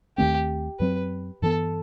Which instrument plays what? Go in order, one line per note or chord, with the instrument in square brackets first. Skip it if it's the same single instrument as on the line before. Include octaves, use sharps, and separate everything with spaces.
[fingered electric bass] D#2 D#3 A3 C4 [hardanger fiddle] G4
[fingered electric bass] F#2 F#3 C4 [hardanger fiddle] B4
[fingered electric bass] G2 E3 B3 [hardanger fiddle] A4